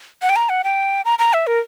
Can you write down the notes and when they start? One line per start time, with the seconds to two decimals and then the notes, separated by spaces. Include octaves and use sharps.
0.22 F#5
0.29 G5
0.36 A#5
0.49 F#5
0.64 G5
1.05 A#5
1.19 A#5
1.33 E5
1.47 A#4